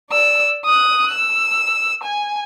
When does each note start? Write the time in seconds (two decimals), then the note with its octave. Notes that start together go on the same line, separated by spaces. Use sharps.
0.10 D5 E6
0.65 D#6 F#6
1.12 E6
2.04 G#5